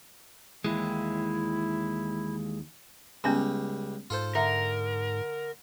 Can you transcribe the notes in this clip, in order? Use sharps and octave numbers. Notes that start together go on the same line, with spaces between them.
D#2 E3 G#3 E4
C#2 G3 B3 C#4 G#5
G#2 F4 A4 C5
D3 A#4 E5 A#5